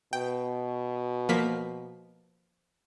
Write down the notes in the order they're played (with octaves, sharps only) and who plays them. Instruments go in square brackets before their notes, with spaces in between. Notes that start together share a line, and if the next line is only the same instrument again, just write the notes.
[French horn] B2 [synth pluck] G5
[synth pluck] F3 A#3 B6